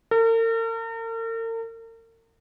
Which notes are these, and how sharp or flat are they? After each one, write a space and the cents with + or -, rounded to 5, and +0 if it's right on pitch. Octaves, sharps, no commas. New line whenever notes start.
A#4 -45